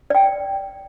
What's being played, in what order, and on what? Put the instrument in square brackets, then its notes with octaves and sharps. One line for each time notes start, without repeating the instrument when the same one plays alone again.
[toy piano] D5 G5